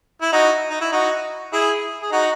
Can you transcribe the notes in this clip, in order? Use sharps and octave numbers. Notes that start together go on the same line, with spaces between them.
E4
D#4 F#4
D#4
E4
D#4 F#4
E4 G#4
G#4
D#4 F#4